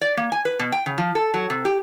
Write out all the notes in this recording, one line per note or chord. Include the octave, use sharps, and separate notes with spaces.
D5
A#3
G#5
B4
B2
G5
C#3
F3
A4
F#3
C3
G4